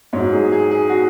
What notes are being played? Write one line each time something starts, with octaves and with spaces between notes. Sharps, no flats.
G#2 F#3 C#5
G#4
G#4
G#4
F#4